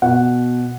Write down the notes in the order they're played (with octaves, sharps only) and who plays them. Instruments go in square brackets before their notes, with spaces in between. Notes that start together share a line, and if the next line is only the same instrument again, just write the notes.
[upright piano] B2 F#5